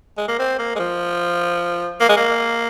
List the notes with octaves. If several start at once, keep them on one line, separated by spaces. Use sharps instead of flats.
G#3
A#3
C4
A#3
G#3
F3
A#3
G#3
A#3